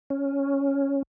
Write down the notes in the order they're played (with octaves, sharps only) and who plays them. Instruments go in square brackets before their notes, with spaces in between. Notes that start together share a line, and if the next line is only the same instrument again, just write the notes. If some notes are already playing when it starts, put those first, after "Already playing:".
[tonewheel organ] C#4